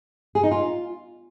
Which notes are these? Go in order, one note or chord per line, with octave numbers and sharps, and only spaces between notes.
G#4
D#4
F4